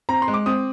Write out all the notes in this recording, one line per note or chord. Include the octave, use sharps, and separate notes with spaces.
C4 A#5
C6
G#3
D6
C4 D#6